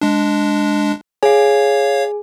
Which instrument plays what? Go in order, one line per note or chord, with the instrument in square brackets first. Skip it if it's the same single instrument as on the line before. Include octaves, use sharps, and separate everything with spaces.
[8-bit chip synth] G#3 D4
[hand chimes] G#4 G#5 [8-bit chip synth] C#5 F5